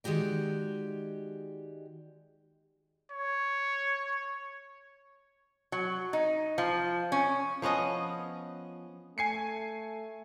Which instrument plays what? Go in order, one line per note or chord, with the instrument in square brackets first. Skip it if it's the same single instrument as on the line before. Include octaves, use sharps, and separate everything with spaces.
[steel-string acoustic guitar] D#3 G#3 F#4 G4 D5
[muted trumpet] C#5
[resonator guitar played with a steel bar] F#3
D#4
F3
C#4
[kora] F3 B3 C#4 D#5
[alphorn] A3 [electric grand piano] G#5 C7 C#7